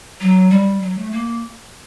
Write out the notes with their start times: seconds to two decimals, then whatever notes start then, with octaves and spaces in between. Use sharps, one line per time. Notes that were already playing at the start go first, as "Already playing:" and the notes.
0.20 F#3
0.51 G3
0.81 F#3
0.97 A3
1.11 A#3